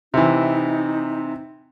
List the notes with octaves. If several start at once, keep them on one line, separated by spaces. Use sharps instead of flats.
C3 E3 D#4